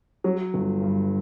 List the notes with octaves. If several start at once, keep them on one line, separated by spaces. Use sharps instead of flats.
F#3
G1
G2